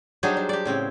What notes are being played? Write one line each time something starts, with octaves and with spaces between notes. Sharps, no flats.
F#3 G3 D4 D#4 G#4 C5
D4
G4 D5
A2 C#3 C4